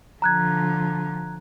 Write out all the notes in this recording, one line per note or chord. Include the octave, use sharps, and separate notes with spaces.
D3 F3 A#5 F#6 G#6